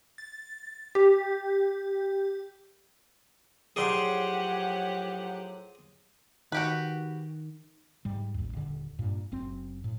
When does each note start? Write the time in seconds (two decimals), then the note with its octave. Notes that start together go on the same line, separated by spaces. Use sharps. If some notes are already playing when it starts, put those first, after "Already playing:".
0.18 A6
0.95 G4
3.76 A2 F3 F#3 G4 G#4 D5 F#5 C6
6.52 D#3 F#4 G4 B4
8.05 G#2 G3
8.34 A1 D#2
8.53 D#1 D3
8.99 G2 A#2
9.32 F#1 F#2 C4
9.84 A2